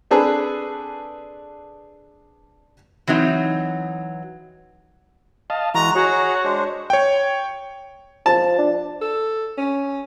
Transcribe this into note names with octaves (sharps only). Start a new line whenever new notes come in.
C4 D4 G#4 A4 B4
E3 F#3 C4 D#4
D#5 F5 A5
E3 G#3 F#4 A#5
F#4 G#4 C#5 F#5 A#5
G#3 D4 C5
C#5 G5
F3 A5
D4
A4
C#4